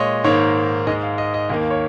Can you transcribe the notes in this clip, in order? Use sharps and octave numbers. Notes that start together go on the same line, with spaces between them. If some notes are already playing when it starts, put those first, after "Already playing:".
Already playing: A#2 G#3 C#5 D#5
G#2 D#3 A#3 C#5
G#2 G#3 D#5
F5
D#5
D#5
D#2 D#3 A#3 D#5
C#5